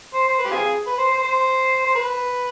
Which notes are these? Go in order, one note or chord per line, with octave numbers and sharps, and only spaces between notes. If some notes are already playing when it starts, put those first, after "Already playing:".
C5
C5
B4
G4
C4 F4 G#4
B4
C5
C5
C5
C5
B4